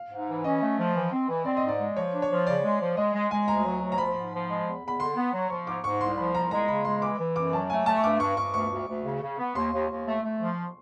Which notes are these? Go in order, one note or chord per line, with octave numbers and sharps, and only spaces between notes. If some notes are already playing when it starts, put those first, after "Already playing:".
Already playing: F5
G#2
E3
C#4 D#5
A3
F3
E3
C4
E3
C4 D5
D#5
G#2
D5
G#3
F3 C#5
D4
C#5
F3
C#3 D5
G#3
F3
G#3 D#5
G#3
G#3 G#5
D2 A#5
F#3
D2
A#5
F3 B5
G#2
F3
G#3
E2
E2 B5
D3 C6
B3
F#3
F3 C#6
G#2 D6
G#2 C#6
C2 C6
F3 B5
C2 A#5
G#3 A#5
C#3 B5
G#3 C6
E3 D6
E3
F#2 D6
F#3 A5
A3 G#5
A3 A5
C#6
G2 D6
G2 C#6
G2 C#6
D2 C#6
D2
D2
C#3
C#3
B3
D#2 C6
D#2
D#2
A3
A3
F3